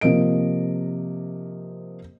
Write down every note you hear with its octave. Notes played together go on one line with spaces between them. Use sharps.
C3 F3 A#3 D#5 D7